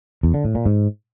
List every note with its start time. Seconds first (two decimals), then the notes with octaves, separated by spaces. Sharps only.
0.23 E2
0.34 D3
0.44 A2
0.55 A#2
0.66 G#2